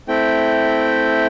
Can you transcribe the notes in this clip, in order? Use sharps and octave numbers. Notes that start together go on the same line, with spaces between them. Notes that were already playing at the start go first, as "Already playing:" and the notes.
A3 C4 E4 G5